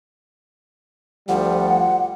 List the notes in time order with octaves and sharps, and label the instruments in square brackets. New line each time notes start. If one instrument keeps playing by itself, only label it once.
[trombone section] D2 F3 G3 [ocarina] F#5